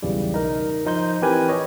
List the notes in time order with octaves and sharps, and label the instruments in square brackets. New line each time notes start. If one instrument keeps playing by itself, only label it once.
[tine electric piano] B1 E2 C#3 E3 G3
D#4 A#4
F3 D#4 C5 G6
E3 C4 G4 A#4 B4 G#5
C#5 D#5